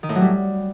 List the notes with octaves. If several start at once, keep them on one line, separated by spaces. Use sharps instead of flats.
D#3
A2
F#3
G3